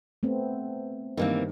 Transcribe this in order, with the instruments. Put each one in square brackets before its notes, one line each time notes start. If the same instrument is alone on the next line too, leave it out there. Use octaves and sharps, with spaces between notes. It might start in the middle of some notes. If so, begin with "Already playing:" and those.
[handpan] A3 B3 C4
[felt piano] G2 D#3 [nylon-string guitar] E3 A#3 C4